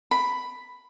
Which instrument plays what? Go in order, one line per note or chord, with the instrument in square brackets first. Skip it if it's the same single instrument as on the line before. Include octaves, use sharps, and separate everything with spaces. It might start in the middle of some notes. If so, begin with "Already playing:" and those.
[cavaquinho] B5